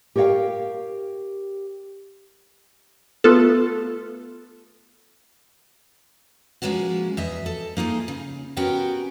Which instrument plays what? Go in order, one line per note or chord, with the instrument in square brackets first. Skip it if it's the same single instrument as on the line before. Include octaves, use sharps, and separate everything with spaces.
[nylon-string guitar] G4 A#4 C#5 D5 F5 G5
[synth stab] A3 B3 F4 A4
[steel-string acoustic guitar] F3 G#3 A#3 C#4 F#4
E2 D#5 E5
A4
A#3 D#4 F4 G#4
C#3
B3 C#4 F#4 G4 A#4 G5